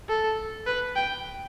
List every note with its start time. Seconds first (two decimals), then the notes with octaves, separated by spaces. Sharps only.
0.09 A4
0.67 B4
0.96 G5